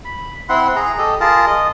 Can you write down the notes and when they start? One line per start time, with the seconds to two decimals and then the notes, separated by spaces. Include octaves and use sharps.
0.05 B5
0.49 C4 E4 F#5 C6
0.76 G#4 A#5
0.98 G4 A4 D#5
1.20 F4 G#4 A#4 A5
1.47 D#5